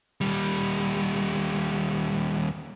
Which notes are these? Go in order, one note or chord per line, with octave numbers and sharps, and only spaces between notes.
D#2 G3